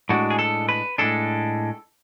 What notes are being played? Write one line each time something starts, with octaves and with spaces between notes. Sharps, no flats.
A2 G#3 D4 F#4
G#4
A4
B4
A2 G#3 D4 A4